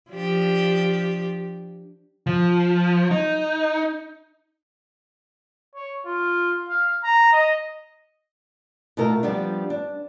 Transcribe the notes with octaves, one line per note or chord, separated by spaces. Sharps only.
F3 D4 G4
F3
D#4
C#5
F4
F5
A#5
D#5
B2 A3 F4 A#4
F3 G3 B3 D4
D4